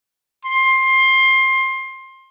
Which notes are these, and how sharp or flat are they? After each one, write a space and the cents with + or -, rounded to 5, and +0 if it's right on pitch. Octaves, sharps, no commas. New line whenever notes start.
C6 +20